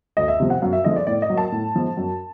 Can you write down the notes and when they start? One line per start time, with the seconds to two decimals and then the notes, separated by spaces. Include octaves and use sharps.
0.17 D2 D#5
0.28 E5
0.40 C3 F3
0.50 F#5
0.62 F#2 F5
0.73 E5
0.84 D3 F3 G#3 D#5
0.96 D5
1.07 A2 D5
1.22 D#5
1.30 F#3 A#3
1.38 A5
1.52 A2
1.76 F3 G#3
1.97 F#2